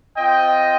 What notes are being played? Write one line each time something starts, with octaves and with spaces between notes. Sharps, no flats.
C4 F4 D#5 G5